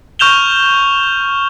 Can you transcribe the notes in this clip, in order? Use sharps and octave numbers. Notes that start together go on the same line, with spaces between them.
C#6 F6 G6 E7 F7 G7